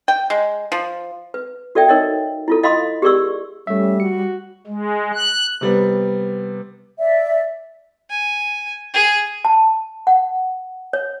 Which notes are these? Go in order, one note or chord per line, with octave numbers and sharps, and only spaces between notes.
G5
G#3
F3
B4
F#4 A4 D5 E5 G5
D#4 A#4 C#5 D#5
E4 F4 A4
D#5 F5 B5 C6 D#6
G4 G#4 A#4 D5 C#6 E6
G3 A3 C#4 E5
F#4 C#7
G#3
F#6
C3 G3 B3
D5 E5
G#5
G#4
A5
F#5
C#5